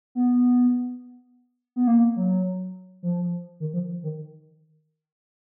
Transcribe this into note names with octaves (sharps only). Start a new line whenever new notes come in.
B3
B3
A#3
F#3
F3
D#3
F3
D#3